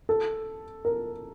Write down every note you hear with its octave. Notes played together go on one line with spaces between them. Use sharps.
A4
A#4